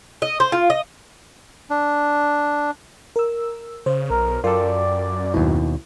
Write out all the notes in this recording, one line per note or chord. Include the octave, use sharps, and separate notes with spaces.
D#5
C5
F4
D#5
D4
A#4 E6
C#3 C5
B1 A#4
F#2 F4 A4 A#4 D5 G5
D#2 B2 E4